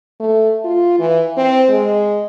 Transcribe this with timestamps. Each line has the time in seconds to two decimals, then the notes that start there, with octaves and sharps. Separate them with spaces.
0.20 A3
0.65 F4
0.99 E3
1.37 C4
1.69 G#3